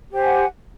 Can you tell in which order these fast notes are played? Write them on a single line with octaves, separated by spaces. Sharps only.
G4 C5 G#5 F#5